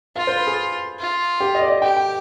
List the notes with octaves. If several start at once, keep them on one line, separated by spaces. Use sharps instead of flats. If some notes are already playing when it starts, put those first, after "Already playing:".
F4 F5
C5
B4
G#4
F4
G4
D#5
D5
D#5
G4 G5
G5